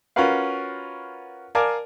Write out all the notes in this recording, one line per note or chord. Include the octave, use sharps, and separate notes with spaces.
C#4 F4 F#4 A#4 B4 F5
A#4 D5 F5 G#5 A5